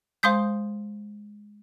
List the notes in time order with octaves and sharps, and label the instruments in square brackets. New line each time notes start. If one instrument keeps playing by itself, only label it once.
[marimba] G#3 [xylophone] C5 F5 C6 D#6 G6